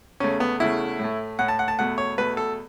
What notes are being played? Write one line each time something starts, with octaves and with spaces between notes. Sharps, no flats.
E2 C#3 A3 C#4
B3
E2 C#3 A3 E4
A2 A3
A2 A3 F#5
A5
F#5
A5
E2 B2 A3 F#5
C#5
E2 B2 A3 B4
A4